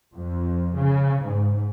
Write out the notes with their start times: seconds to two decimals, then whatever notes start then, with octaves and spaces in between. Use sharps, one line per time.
0.14 F2
0.75 C#3
1.22 G#2